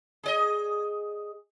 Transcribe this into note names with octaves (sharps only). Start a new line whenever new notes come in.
G#4 D5 D#5